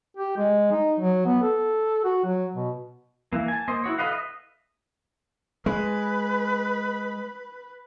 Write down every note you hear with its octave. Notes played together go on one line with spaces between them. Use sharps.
G4
G#3
D#4
F#3
B3
A4
F#4
F#3
B2
E3 A#3
G#5 A5
A#3 C5 D#5
E4 F#4 C#5
A4 B4 D#5 F5 F#5
D#5 E5
G#3 B4